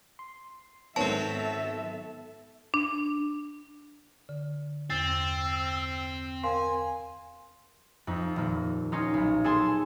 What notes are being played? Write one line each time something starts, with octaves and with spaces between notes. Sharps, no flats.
C6
G#2 D#3 F#3 B3 C4 A4 E5 A5
D4
D3
E2 G2 C4 E6 A6 C7
A#4 F5 G#5 C6
F2 D#4
D#1 A#3
C#4 D#4 F4
B1
G#4 A4 G#5 A5 C6